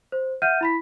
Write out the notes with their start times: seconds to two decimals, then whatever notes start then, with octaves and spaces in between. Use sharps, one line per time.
0.12 C5
0.42 E5 F#5 F6 G6 D#7
0.61 E4 B5 B6